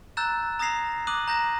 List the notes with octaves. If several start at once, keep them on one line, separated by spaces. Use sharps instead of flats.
A#5 E6 F#6 G6 A6 E7
A#5 D#6 G#6 A#6 C7 F7
D6 D#6 F#6 D#7 F#7
A#5 G6 A#6 E7